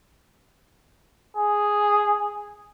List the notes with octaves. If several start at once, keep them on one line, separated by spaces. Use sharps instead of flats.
G#4